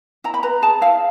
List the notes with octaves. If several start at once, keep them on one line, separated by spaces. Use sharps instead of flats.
E4 A#5
B5
B4 A#5
G#4 A5
E4 F5